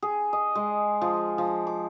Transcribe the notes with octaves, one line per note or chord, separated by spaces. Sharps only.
G#4
D#5
G#3
F3
F3
D6